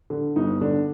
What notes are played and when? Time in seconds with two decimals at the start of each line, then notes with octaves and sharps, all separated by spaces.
0.10 D3
0.36 G1 D#4
0.61 D3 D4